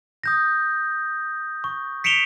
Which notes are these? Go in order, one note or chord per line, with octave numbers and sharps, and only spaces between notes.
D#6 G6 A#6
C#6
B6 C#7 D7 E7 F7 G7